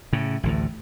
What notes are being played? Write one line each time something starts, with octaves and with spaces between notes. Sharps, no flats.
A2 C#3
A1 D2 A2